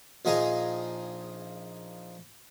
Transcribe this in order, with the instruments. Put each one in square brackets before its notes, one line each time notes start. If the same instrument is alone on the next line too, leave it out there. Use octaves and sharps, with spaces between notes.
[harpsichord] A#1 F3 D#4 G#4 G#5 A#5